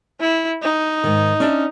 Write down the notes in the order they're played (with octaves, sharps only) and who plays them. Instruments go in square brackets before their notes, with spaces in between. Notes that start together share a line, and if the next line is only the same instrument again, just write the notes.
[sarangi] E4
D#4
[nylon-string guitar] G#2 D#3
C#4 D4 E5